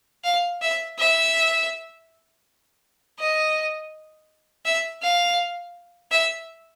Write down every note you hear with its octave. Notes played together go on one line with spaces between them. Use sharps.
F5
E5
E5
D#5
E5
F5
E5